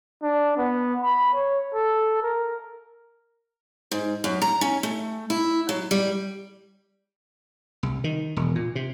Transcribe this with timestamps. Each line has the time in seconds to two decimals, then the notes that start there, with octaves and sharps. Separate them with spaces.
0.23 D4
0.57 B3
1.02 B5
1.34 C#5
1.74 A4
2.23 A#4
3.91 G#2
4.24 F#2
4.42 A#5
4.61 C#4
4.83 A3
5.30 E4
5.69 F#3
5.91 G3
7.83 C2
8.04 D#3
8.36 E1
8.55 A#2
8.75 C3